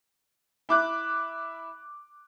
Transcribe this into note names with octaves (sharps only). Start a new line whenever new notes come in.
E4 D6 F#6